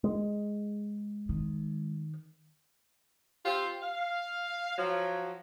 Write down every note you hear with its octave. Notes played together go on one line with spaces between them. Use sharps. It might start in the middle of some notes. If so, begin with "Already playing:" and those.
G#3
D#3
C4 F4 G4 C5
F5
F3 F#3